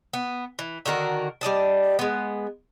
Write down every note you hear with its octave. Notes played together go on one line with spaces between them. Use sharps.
B3
E3
D3 D#3 F#4 A#4
G3 D5 D#5 A5
G#3 B3